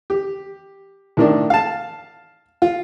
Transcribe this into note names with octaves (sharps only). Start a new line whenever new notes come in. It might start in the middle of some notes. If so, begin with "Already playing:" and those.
G4
A2 D#3 D4
F5 A5
F4